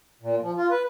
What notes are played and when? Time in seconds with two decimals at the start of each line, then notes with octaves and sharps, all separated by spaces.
0.22 A#2
0.42 F3
0.57 F4
0.70 B4